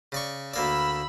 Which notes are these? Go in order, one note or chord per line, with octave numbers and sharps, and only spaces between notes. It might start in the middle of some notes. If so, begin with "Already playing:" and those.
C#3 D5 C#6
D2 A#3 D5 B5 E6